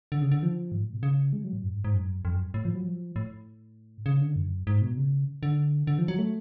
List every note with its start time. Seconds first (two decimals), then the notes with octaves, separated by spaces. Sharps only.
0.12 D3
0.22 C#3
0.31 D3
0.43 F3
0.72 G#2
0.82 A2
0.93 B2
1.03 C#3
1.33 G#3
1.44 F#3
1.53 A2
1.64 F#2
1.74 G#2
1.84 G#2
1.94 F#2
2.25 F2
2.34 F#2
2.54 A2
2.65 F3
2.74 F#3
2.85 F3
3.16 A2
4.06 C#3
4.21 D3
4.36 F#2
4.67 G#2
4.82 B2
4.97 C#3
5.43 D3
5.87 D3
5.98 F3
6.08 F#3
6.19 A3